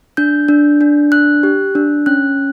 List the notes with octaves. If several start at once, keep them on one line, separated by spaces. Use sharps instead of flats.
D4 G6
D4
D4
D4 F#6
G4
D4
C#4 F#6